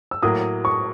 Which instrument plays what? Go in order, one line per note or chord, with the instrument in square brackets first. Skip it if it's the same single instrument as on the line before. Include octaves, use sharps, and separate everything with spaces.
[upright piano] E6
[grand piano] A2 F#3 A#3 [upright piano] D#6
[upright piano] C#6